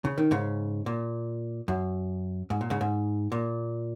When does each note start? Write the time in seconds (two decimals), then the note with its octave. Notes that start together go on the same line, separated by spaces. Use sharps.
0.05 C#3
0.18 D#3
0.31 G#2 C#3
0.86 A#2
1.68 F#2
2.50 G#2
2.61 A#2
2.70 G#2 C#3
2.81 G#2
3.32 A#2